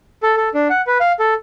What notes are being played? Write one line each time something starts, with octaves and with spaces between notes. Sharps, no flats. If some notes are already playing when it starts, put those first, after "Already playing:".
A4
A4
D4
F#5
B4
F5
A4